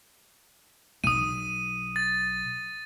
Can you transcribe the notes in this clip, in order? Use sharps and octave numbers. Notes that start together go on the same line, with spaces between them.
B1 D#6 D#7
A6